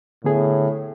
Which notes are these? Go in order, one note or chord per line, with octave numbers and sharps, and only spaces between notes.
A2 D3 B3 G#4